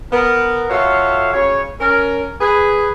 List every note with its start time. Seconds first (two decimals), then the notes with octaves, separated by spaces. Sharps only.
0.13 B3 A#4
0.70 F4 F#4 A4 C#5 E5 F5
1.34 C#3 C#5
1.81 C#4 A#4
2.41 G#4 B4